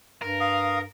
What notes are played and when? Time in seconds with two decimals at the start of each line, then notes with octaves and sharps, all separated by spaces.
0.22 G2 A#4
0.40 F5 D#6